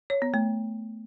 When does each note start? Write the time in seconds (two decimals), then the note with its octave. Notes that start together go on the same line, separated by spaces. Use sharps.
0.10 C#5
0.22 B3
0.34 A3